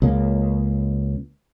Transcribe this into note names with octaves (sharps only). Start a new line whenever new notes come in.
C#2 C#3 A#3